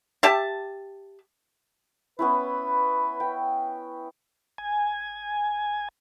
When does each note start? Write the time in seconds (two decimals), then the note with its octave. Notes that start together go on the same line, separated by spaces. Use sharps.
0.23 G4 E5 A5
2.19 B3 C#4 E4 B4
3.20 G5
4.58 G#5